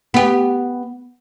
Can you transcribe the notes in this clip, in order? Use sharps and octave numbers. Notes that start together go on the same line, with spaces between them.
B3 G4